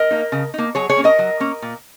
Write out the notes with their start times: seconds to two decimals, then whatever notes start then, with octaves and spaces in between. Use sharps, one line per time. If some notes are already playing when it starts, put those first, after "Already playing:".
Already playing: A#4 D#5
0.11 A#3 D#4
0.32 C#3
0.54 A#3 D#4
0.75 F#3 G#4 C#5
0.89 G#4 C#5
0.97 A#3 C#4
1.04 A#4 D#5
1.19 F#3
1.40 A#3 C#4
1.62 A#2